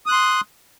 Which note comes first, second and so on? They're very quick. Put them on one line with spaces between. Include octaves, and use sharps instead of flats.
D#6 F#6 C6